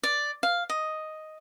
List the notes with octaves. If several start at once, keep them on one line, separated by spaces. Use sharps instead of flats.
D5
F5
D#5